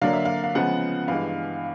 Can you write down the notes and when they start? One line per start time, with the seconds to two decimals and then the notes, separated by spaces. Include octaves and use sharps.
0.01 D3 F#3 A#3 D4 F5
0.13 E5
0.25 F5
0.44 F5
0.55 C#3 F3 G#3 B3 F#5
1.08 G2 E3 G#3 F5